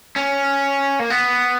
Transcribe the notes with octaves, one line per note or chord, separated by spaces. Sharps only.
C#4
A#3
B3